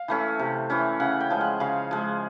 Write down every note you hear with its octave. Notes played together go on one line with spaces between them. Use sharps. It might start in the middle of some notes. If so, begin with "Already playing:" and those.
Already playing: F5
E3 A3 C#4
C3
E3 A3 C#4
C#3 F#5
G5
F3 G#3
F#5
C#3 F5
F3 G#3